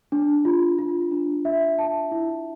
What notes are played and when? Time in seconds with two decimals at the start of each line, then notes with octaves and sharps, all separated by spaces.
0.12 D4
0.45 F4
0.79 F4
1.11 D4
1.45 E5
1.78 A5
2.12 E4